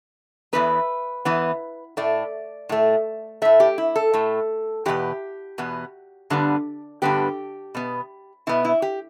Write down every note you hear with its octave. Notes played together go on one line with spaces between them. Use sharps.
E2 E3 B3 B4
E2 E3 B3
A2 A3 D5
A2 A3
A2 A3 E5
G4
E4
A4
A2 A3
E2 B2 B3 G4
E2 B2 B3
G2 D3 G3 B3
G2 D3 G3 B3 G4
B2 B3
B2 B3 E4
E4
G4